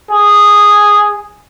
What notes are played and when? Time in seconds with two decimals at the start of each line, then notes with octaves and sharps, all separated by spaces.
0.10 G#4